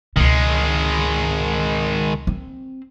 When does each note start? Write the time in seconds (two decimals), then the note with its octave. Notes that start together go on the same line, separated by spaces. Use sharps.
0.17 C#2 B2 D#3 G#3
2.27 C4